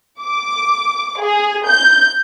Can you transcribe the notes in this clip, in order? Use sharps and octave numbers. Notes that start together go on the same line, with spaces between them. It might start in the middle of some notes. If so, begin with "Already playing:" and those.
D6
G#4
G6